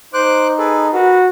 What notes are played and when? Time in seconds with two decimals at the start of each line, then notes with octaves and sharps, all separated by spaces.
0.14 D#4 C5 D6 F#6
0.58 G#4 A4 B4
0.93 F#4 A#4 B4